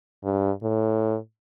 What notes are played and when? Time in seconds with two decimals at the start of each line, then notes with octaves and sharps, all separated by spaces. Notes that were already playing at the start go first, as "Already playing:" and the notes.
0.24 G2
0.63 A2